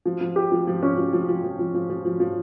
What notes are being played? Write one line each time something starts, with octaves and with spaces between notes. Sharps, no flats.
F3
F3
G4
F3
F3
C#4
F3
F3
F3
F3
F3
F3
F3
F3
F3